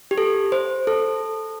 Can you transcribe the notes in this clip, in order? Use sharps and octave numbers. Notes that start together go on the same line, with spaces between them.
G4
A4
C5
A4